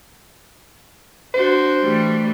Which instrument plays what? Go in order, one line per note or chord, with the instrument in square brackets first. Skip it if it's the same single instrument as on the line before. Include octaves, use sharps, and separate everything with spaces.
[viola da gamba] D4 F#4 [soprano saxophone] C5
[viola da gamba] E3 G3 A3